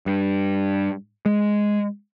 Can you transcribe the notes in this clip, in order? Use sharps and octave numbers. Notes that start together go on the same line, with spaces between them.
G2
G#3